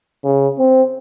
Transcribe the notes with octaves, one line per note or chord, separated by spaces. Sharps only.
C#3
C4